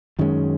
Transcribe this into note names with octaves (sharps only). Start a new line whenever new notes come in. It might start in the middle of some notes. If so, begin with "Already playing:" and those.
F#2 D#3 G#3 C#4